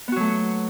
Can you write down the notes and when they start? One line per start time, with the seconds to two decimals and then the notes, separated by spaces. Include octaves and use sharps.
0.08 B3
0.12 F#4
0.16 F#3
0.20 A3